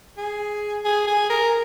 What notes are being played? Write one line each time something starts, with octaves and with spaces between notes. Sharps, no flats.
G#4
G#4
G#4
A#4